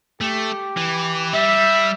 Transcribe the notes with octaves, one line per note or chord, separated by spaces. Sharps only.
A3 G4
E3
G3 E5